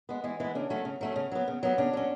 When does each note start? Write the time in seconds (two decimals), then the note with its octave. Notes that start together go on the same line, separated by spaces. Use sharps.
0.09 G#3 B3
0.24 E3 G#3 G#4
0.40 E3 G#3 B3 E4
0.55 C#3 D4
0.70 F#3 A3 C#4
0.85 C#3
1.01 F#3 A3 C#4
1.16 C#3
1.31 F#3 B3
1.48 C#3
1.63 F#3 B3
1.78 C#3 D4
1.93 F#3 C#4